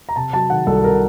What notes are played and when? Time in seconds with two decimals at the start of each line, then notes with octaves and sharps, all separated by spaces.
0.09 A#5
0.16 C3 A5
0.33 F#3 A5
0.50 D#3 F#5
0.67 C2 A4
0.83 C3 A#4